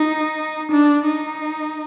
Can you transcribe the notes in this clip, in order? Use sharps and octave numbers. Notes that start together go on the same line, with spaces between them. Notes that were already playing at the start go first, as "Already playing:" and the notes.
Already playing: D#4
D4
D#4